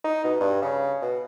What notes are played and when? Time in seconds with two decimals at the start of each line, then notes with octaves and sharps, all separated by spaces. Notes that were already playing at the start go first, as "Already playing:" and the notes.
0.04 D#4
0.24 B2
0.41 G2
0.62 C#3
1.02 B2